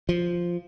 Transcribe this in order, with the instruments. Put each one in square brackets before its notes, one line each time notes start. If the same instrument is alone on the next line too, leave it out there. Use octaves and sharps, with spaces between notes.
[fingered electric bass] F3